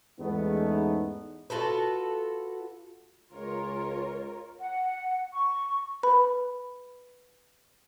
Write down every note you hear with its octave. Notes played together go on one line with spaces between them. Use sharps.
E2 G#2 A3 B3 C#4 D#4
F4 F#4 A4 B4
C#2 F4 A#4 C#5
F#5
C#6
B4 B5